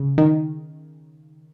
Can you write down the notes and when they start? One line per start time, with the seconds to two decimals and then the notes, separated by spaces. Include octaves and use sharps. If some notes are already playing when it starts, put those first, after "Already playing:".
Already playing: C#3
0.18 D#3